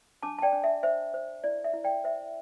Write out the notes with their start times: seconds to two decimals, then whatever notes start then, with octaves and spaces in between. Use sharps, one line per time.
0.23 D4 A5 D6
0.39 A5
0.42 D5 G5
0.53 D4
0.64 E5
0.83 C5 E5
1.14 C5
1.44 E4 D5
1.64 E5
1.74 E4
1.84 D5 G5
2.04 C5 E5